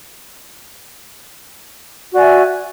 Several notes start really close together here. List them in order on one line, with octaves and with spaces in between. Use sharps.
F#4 D5 G#5 E5